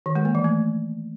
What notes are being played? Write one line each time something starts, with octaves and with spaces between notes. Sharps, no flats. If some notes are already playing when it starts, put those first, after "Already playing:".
D#3
G#3
A#3
E3
A3